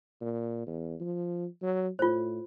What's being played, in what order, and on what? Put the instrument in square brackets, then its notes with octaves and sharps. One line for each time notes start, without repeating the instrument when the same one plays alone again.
[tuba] A#2
E2
F3
F#3
[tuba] A2 [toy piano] F4 C5